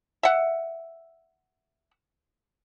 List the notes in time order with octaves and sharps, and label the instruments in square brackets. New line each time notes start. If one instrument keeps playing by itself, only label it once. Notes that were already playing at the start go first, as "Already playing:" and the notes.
[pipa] E5 F#5